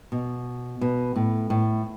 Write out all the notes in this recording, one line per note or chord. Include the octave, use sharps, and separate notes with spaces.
B2
B2
A2
A2